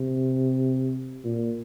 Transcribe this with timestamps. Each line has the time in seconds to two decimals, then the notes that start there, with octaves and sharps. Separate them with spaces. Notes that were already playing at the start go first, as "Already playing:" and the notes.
Already playing: C3
1.24 A#2